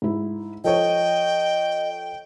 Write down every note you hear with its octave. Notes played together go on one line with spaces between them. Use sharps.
G#2 E4
F3 A4 C#5 D#5 G5